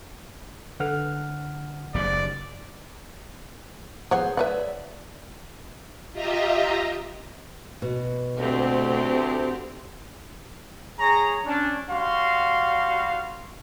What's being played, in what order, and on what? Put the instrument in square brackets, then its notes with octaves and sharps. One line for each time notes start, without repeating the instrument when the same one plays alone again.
[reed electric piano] D3 F#5 F6 [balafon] A4 B4
[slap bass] F#1 D#2 G#2 [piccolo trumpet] D5
[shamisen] B3 C#5 F#5 [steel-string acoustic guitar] G#4 C5
[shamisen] B4 C#5 F#5 [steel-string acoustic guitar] D5 E5
[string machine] F4 G4 D#5 E5 A#5
[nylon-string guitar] B2
[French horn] D2 [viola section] A3 C4 G4
[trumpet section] G#4 C#5 A#5
C#4 D4
G3 F#4 F5 C6